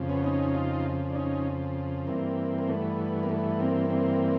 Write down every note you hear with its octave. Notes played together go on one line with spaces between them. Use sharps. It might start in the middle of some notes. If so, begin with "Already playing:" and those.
Already playing: F2 C#3 F3
B3 C#4
C#4 D#4
D#4 F4
D4
C#4 D#4
G2 E3 A#3 C4
A#3
A3 B3
A#3
A3 B3
A#3 C4
A#3 C4